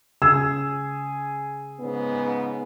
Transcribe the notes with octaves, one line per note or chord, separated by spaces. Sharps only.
C#3 G#4 E6
G#2 C#3 B3